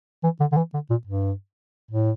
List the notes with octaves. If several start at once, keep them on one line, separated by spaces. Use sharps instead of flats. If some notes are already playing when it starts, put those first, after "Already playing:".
E3
D3
D3
E3
D3
A#2
G2
A2